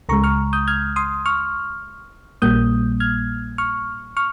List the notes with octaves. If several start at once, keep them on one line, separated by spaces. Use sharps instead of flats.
C#2 C#3 G#3 A#5 C#6
C#6 F6
D#6 G6
F6 G#6
C6 D#6
C#6 F6
A#1 A#2 G3 A#3 D#6 G6
F6 G#6
C#6 F6
C#6 F6